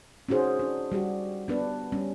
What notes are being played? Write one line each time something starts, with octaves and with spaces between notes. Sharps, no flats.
C#4 D#4 F#4 G#4 C5
D4
G3 F#4 G4
B3 D4 B4
G3 C#4